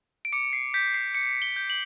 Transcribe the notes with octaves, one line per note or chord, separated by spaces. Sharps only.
D7
D6 C#7
C7
G6 B6
C7
G6 C#7
G7
G6
F#7